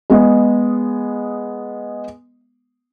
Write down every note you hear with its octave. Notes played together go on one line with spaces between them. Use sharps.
G#3 B3 D#5